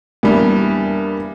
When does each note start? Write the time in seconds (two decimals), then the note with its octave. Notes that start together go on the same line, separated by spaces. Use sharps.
0.23 E2 G3 A#3 D4